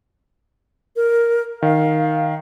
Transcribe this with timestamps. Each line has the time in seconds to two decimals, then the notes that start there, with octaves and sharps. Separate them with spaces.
0.96 A#4
1.62 D#3 F5